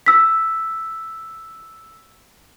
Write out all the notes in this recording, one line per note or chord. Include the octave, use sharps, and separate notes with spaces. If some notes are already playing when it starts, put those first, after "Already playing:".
E6 B6